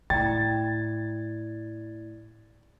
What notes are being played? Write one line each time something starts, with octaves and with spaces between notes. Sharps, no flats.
A2 E4 D5 G5 A#5 G#6 A6